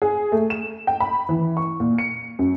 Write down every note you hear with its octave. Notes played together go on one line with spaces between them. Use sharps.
G#4
A3
E7
G5
B5
E3
C#6
A#2
C#7
F#2